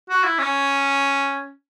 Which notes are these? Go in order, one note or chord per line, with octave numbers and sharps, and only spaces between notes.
F#4
E4
C#4